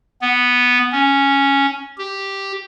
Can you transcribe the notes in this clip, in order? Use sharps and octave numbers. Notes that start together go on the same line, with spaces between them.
B3
C#4
G4